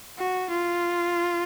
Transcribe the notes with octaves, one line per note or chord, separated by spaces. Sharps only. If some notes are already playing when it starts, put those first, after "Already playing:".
F#4
F4